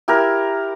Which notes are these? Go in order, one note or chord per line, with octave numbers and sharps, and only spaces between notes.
E4 G4 A#4